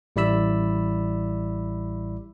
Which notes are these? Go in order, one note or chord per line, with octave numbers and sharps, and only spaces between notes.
A1 G3 E4 D5 B5 E6